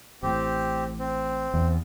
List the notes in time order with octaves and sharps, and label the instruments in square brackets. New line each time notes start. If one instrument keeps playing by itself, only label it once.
[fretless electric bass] A1 A2 [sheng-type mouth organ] C4 G4
[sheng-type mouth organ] C4
[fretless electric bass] E2